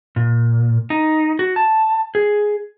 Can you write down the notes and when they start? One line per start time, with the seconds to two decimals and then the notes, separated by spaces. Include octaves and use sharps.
0.16 A#2
0.90 D#4
1.39 F#4
1.56 A5
2.15 G#4